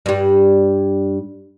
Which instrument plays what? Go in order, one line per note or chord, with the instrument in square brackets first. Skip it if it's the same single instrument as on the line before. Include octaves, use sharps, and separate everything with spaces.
[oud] G2 G3